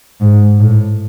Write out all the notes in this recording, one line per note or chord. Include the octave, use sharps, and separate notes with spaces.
G#2
A2